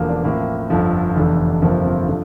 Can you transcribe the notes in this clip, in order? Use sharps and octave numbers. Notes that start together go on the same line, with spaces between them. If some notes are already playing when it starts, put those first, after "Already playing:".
Already playing: E1 E2 D3 F3 A#3
D4
A1 A2 F3 A#3
G1 F2 D3 F3
F1 E2 D3
G1 F2 C3 F3 A#3
C4
D3 F3